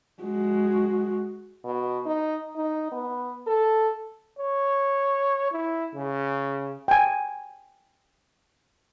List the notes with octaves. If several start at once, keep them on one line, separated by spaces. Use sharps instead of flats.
G#3 F#4
B2
D#4
D#4
B3
A4
C#5
E4
C#3
G5 G#5